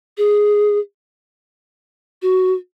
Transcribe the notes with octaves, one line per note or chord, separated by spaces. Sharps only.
G#4
F#4